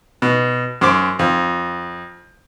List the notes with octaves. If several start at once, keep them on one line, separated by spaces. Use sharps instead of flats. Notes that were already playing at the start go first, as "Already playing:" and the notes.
B2
F#2 C5 D6
F2